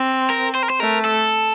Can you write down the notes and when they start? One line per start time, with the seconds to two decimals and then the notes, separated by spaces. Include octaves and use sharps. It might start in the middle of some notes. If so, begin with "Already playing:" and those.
Already playing: C4
0.30 A#4
0.55 C5
0.63 A#4
0.70 C5
0.80 A3 A#4
1.05 A4